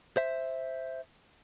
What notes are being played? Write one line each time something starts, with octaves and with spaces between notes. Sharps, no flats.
C5 E5